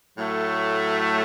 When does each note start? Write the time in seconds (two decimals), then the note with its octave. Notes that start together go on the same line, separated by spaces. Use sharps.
0.17 A2 F#3 A3